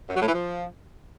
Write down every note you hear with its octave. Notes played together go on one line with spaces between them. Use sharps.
F#2
F#3
A2
E3
F3